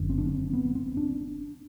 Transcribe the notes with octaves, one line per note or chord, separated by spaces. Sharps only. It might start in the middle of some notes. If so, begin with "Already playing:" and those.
Already playing: F#1 F#2 D3
C4
D4
C4
B3
C4
D4